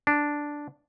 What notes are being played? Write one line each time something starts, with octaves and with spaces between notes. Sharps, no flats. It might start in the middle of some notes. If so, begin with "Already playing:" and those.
D4